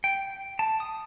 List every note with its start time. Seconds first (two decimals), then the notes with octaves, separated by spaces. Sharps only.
0.04 G5
0.59 A5
0.80 D#6